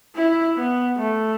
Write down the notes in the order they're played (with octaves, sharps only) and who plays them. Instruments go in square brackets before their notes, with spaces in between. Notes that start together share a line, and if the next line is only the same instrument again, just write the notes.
[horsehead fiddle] E4
B3
A3